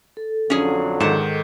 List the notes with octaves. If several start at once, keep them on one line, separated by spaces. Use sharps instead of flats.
A4
F2 D3 F#3 C#4 G#4
G#2 D#3 F#5 A5